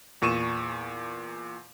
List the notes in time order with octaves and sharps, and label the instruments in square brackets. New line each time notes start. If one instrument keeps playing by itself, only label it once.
[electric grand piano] E2 A#2 C#6 D#7 E7